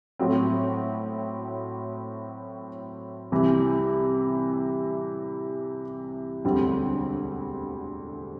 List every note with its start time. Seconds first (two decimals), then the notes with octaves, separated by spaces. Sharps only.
0.19 A2 F#3 C4
3.32 C2 C3 E3 G3
6.44 E1 D2 D3 G3 C4